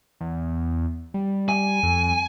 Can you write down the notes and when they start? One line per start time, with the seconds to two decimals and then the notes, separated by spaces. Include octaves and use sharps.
0.20 E2
1.14 G3
1.49 G#5
1.83 F2